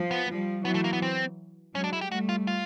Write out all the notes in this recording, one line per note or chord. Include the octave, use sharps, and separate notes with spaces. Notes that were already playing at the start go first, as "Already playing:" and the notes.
Already playing: F3
B3
F3 G3
E3 F#3 B3
A3
A#3
B3
C4
F#3 G#3 C#4
D4
E4
G4
G3 A3 F#4
F4
F4